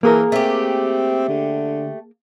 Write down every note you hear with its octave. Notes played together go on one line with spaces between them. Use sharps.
E3 A#3 G#4 A#4
A3 C4 G4
D3